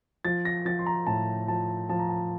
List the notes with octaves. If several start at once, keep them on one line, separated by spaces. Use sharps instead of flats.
F3 A6
A#6
F3 A6
C6
A#5
A2 A5
F3 A5
F3 A5
A#5
A5